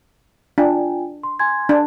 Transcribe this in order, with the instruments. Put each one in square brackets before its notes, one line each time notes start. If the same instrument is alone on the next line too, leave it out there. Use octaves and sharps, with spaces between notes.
[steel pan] D4 [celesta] F4 G5 G#5
[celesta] C6
G#5 C6 G#6
[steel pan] D4